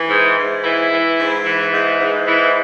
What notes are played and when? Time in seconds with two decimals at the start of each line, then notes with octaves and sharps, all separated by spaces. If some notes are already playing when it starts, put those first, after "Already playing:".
Already playing: E3
0.09 G#2
0.38 G#2
0.64 E3 E4
0.91 E3
1.18 G#2
1.45 E3
1.73 G#2
2.00 G#2
2.26 E3